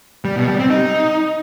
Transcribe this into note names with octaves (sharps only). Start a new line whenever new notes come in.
G3
B2
G3
C4
D#4